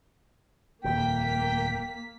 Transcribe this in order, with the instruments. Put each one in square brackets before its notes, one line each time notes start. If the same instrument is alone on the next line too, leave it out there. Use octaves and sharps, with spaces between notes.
[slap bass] D#1 F2 [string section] A#3 B6 [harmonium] G5